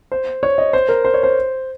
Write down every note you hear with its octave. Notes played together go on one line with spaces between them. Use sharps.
C5
C#5
D#5
C5
A#4
C5
C#5
C5